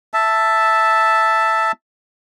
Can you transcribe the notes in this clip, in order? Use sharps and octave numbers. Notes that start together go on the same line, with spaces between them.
E5 A5